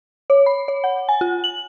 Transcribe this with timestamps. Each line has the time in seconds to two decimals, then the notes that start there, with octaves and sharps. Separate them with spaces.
0.30 C#5
0.46 B5
0.68 C#5
0.84 F#5
1.09 G#5
1.21 F4
1.44 F#7